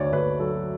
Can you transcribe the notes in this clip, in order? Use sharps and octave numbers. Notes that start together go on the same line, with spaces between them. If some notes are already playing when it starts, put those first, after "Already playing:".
Already playing: D2 D3 C#5 D5
D2 B4
F#3 A4